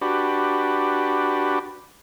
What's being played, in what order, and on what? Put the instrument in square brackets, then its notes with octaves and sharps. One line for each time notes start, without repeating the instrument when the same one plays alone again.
[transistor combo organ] D4 F#4 G4 B4